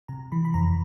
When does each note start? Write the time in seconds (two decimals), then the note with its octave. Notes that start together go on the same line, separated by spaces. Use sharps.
0.08 C3 A#5
0.32 E3 B5
0.45 B5
0.54 F2 A#5